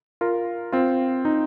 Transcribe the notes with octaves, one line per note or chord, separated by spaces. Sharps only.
F4 A#4
C4 F4
D#4